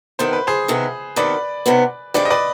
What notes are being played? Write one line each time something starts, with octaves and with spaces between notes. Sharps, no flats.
C3 D#3 B3 C5
B4
G#4 C5
C3 D#3 B3
C3 D#3 B3 B4 D5
C3 D#3 B3
G2 D#3 G#3 C4 G4 B4 D5
D#5
B4 D5